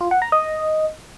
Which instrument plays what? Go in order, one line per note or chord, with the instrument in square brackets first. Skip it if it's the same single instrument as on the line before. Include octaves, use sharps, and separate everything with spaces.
[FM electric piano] F4
F#5
A#5
D#5